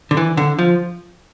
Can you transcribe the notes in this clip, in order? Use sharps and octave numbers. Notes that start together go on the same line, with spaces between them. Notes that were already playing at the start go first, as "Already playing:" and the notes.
D3
E3
D3
F3